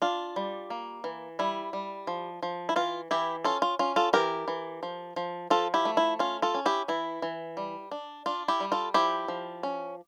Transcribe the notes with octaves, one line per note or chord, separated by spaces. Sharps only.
D4 F4
G3
A#3
E3
G3 E4
G3
F3
F3
E4
E3 F4
E3 E4 G4
C#4 F4 A4
F4
C#4 F4
F4 A4
E3 G4 A#4
E3
F3
F3
F3 F4 A4
E4 G4
A3
E4
C#4 F4
F4 A4
C#4
E4 G4
E3 E4
E3
G3
D4
D4 F4
E4 G4
G3
F4 A4
F3 E4 G4
F3
C#4